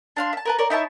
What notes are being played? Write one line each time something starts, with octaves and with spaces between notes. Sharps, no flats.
D4 F5 C6
E5 A5
A#4 B4 A5
A#4 C#5 D5
D#4 E4 C#5 A5